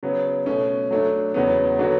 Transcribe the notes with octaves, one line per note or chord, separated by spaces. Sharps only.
C#3 F#3 B3
B2 A3 C#4
F#3 A3 D4
E2 C#3 F#3 B3
D3 F#3 B3 F#4